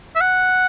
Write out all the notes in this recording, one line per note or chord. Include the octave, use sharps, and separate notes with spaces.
E5
F#5